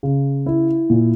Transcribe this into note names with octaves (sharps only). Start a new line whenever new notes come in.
C#3
E4
A#2